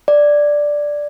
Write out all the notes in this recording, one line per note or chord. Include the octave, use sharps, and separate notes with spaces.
D5